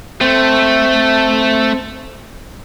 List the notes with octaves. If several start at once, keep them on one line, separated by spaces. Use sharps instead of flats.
A3 C4